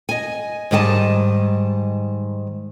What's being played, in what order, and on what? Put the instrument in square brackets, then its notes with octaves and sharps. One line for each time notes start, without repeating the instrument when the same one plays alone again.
[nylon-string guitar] D#5 G#5
G#2 D#3 G3 D#5 G5 A5